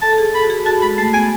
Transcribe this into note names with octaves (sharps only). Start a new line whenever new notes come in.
A4 A5
A4
G#4
A4 B5
F#4
G#4
F#4 A5
G#3 B5
A3 A5
B3 G#5